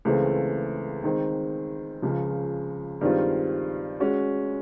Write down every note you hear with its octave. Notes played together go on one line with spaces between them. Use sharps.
C#2 C#3 E3 A3 C4
D#3 G#3 C4
C#2 C#3 F3
G2 D#3 G#3 C4 F4
G#3 C#4 F#4